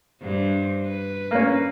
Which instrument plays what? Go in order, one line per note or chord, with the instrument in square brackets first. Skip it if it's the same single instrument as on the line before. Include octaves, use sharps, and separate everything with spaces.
[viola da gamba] G2 C5
B4
[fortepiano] A#3 C#4